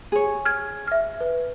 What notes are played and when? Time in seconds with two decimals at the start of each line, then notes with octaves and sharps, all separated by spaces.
0.12 G#4 C#5
0.45 F6 G#6
0.87 E5 F6
1.20 B4